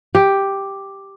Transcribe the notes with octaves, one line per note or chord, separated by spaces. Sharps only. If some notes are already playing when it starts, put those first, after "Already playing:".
G4